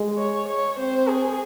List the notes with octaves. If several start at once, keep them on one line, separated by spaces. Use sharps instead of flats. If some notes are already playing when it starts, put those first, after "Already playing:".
Already playing: G#3
C#5
C#5
C4 C5
G#4